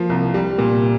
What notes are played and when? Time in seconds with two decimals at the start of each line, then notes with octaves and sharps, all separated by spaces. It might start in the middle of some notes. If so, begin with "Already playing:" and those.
Already playing: F3 A#3
0.10 C2
0.34 G3
0.58 A#2